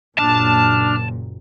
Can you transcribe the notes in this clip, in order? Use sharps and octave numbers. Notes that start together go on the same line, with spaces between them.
F#1 A#2 D4 A5 F6